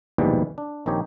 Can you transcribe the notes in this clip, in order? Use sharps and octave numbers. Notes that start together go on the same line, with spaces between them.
A#1 D#2 G#2 B2 E3 G3
D4
A#1 D#3 C4 D#4 G4 C#5